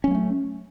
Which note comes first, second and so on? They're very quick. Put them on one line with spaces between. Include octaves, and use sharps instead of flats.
C#4 F#3 A#3 A3